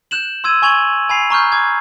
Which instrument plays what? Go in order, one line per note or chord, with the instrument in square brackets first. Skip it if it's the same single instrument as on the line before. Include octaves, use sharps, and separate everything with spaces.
[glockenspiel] F#6 G6 E7 F#7
C6 E6 G#6 D#7
G#5 C#6 G#6 F7 F#7
G#5 B5 C7
A#5 C#6 F6 G6
D6 G#6